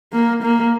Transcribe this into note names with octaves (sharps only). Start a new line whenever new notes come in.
A#3
A#3